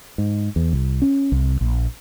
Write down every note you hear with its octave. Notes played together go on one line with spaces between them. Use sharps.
G#2
E2
C2
C#4
C2
A#1